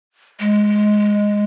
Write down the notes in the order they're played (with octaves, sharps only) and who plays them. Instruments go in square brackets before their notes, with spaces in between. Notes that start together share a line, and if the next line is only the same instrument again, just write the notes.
[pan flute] G#3